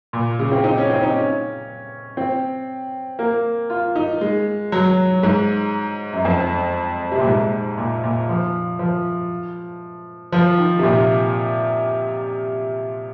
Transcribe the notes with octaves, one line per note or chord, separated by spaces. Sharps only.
A#2
C#3
C4
D#4
C#4
C4
D#4
C#4
C4
A#3
F4
D#4
G#3
F#3
G#2
F#2
F2
C3
A#2
G#2
A#2
A#2
F3
F3
F3
D#3
C3
A#2